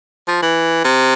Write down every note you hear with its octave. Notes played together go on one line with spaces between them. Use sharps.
F3
E3
C3